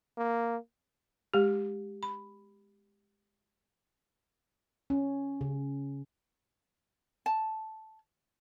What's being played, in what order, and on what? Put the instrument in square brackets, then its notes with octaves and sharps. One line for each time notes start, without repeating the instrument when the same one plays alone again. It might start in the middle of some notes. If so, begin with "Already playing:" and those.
[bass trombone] A#3
[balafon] G#3 G4
B5
[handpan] C#4
C#3
[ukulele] A5